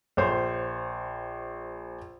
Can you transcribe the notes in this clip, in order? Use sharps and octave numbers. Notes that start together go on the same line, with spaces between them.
A#1 C5 C#5